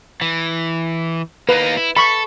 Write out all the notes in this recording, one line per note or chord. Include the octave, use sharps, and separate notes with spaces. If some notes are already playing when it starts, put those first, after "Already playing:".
E3
A#3 D#4 B4
E4
A4 B5 C#6